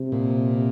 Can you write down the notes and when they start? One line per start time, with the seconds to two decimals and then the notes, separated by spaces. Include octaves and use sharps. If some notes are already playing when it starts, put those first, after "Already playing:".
Already playing: C3
0.12 A#2